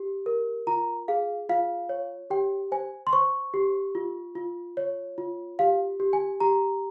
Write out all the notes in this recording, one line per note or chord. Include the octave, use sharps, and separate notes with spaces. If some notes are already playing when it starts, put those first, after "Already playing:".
Already playing: G4
A#4
F4 A#5
G#4 F5
F4 F5
C#5
G4 G5
C5 G#5
C6
C5 C#6
G4
F4
F4
C#5
F4
G4 F5
G4
G#5
G4 A#5